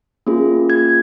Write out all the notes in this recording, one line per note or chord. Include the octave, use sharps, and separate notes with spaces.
A#3 C#4 F4 G#4
G#6